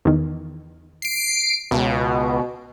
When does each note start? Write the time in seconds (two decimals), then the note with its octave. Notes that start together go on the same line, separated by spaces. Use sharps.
0.05 E2 D#3
1.02 C7 D7
1.71 C#2 B2